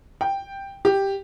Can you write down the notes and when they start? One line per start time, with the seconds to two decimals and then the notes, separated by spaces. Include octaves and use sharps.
0.21 G5
0.85 G4